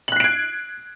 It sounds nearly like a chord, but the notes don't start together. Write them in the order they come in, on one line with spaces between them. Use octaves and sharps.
F#7 F#6 C7 D7 G#6